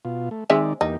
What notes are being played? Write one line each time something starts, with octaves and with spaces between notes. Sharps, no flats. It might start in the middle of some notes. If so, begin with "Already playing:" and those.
B2 F4
A3
D#3 G#3 C4 D#4 D5 E5
E2 A#3 D#4 G4